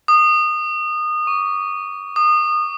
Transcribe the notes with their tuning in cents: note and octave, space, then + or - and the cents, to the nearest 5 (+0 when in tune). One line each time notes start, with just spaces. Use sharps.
D#6 -25
C#6 +35
D#6 -30